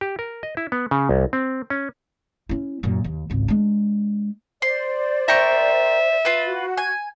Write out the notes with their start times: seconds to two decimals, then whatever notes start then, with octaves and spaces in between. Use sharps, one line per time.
0.01 G4
0.19 A#4
0.43 D#5
0.57 E4
0.72 B3
0.91 C#3
1.09 C2
1.33 C4
1.70 C#4
2.49 C#4 E4
2.83 F#2 A#2
3.04 D#2
3.30 G#1 C#2
3.48 G#3 D4
4.62 C5 D5 C6
5.28 A#4 E5 G5 C#6
6.25 F4 B4
6.45 F#4
6.77 G#5